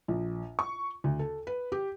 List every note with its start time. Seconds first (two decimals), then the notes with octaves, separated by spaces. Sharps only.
0.08 A#1
0.59 C#6
1.04 D2
1.19 A4
1.47 B4
1.72 G4